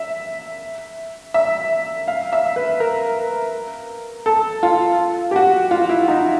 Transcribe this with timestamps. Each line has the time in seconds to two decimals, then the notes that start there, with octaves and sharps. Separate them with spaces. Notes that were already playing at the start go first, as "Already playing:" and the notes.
Already playing: E5
1.34 E5
2.08 F5
2.33 E5
2.56 B4
2.80 A#4
4.26 A4
4.63 F4
5.31 G4
5.36 F#4
5.71 F4
5.89 E4
6.08 D#4